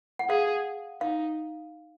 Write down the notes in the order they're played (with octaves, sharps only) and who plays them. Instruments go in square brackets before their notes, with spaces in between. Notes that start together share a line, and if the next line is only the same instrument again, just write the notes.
[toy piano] F#5
[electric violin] G#4 [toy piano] F5
[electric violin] D#4 [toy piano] F5